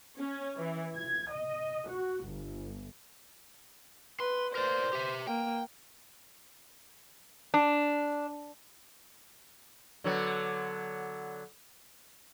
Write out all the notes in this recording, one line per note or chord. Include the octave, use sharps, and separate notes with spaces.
C#4
E3
G#6
D#5
F#4
G1
B4 C6
A#4 C5 D5
G4 E5
A#3 G5
D4
D3 F#3 B3